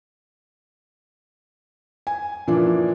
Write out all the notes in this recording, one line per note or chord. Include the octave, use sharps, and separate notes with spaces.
G#5
A#2 E3 F3 D4